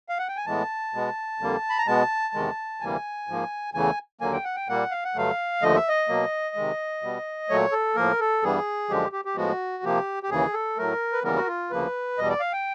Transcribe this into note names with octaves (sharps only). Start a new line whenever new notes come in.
F5
F#5
G5
G#5
A2 E3 G#3 B3 A5
B2 G#3 B3
F2 D3 G3 A#3
B5
A#5
B2 G#3 B3 A5
E2 C3 D#3 G#3
D2 C3 E3 G3 A#3 G#5
G#2 F3 A#3
E2 C#3 E3 A3 G#5
D#2 D3 F#3 A#3 G#5
G5
F#5
G5
A#2 G3 A#3 F#5
F5
F#5
G2 D3 F#3 A3 F5
D#2 D3 F3 A3 D#5
E5
D#5
B2 F#3 A#3
C3 D#3 G#3
B2 G3 B3
A#2 F#3 A3 C#5
A4
A2 F3 A#3 A#4
A4
G2 E3 G3 B3 G#4
F#2 D3 F3 G#3 G4
G4
G4
A2 F3 G#3 B3 F#4
C3 F3 A#3 G4
G4
D#2 C#3 E3 G#4
A4
A2 F#3 A3 A#4
B4
D#2 C#3 E3 G3 B3 A#4
F#4
F4
D2 C#3 F3 A#3 B4
E2 B2 G3 D#5
D5
F5
G5